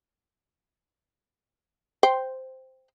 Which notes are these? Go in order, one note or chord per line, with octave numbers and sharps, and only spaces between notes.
C5 G5